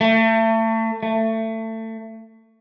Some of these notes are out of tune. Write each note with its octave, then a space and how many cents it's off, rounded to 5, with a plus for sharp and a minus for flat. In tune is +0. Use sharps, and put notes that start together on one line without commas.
A3 +30
A3 +25